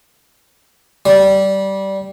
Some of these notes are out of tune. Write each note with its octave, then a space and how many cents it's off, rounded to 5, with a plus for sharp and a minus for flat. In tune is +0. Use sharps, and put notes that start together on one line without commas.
G3 -15